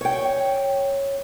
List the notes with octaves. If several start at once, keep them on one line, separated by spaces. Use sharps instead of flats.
C#5 G5